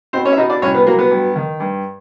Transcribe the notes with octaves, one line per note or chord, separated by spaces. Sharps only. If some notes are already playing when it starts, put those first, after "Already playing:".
B2 C4 C5
C#4 C#5
E5
B2 D#4 D#5
D4 D5
C2 C#4 C#5
B3 B4
F#3 A#3 A#4
B3 B4
G2
D#3
G2